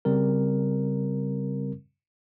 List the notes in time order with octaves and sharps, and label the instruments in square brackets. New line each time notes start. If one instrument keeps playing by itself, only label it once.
[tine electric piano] C#3 G3 C4 A#4